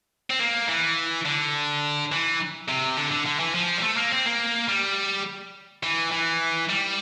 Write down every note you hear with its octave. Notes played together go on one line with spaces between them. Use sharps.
C4
A#3
E3
D3
E3
C3
D3
D3
D3
E3
F3
G3
A3
A#3
C4
A#3
G3
E3
E3
G3